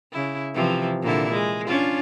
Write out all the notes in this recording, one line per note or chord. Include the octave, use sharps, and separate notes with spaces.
C#3 E4
C3 E3 F3
A#2 D3 E4
G#3
C#4 D4 F4